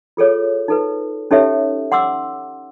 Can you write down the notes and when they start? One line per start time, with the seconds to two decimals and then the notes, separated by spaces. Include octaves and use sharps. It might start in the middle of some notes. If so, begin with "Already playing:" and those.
0.17 F4 G#4 A4 C#5
0.68 D#4 A4 B4
1.31 C#4 D#4 G4 A4 C#5 E5
1.92 F#5 C6 D6 E6